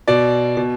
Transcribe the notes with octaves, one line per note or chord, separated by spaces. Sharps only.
B2 D5
B2